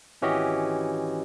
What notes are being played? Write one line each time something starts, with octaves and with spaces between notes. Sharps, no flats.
G#1 E3 C#4 F#4 G4 D#5